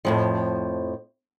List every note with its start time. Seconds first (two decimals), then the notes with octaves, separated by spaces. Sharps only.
0.05 F2 A2 F3